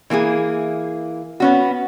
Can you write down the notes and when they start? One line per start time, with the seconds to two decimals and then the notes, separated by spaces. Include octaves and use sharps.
0.10 E3 A#3 E4 G#4
1.40 B3 C#4 F#4